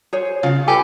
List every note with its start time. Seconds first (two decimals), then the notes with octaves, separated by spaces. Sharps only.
0.13 G#4 C5 C#5
0.43 C#3 F4 F5
0.68 G4 A4 B4 G#5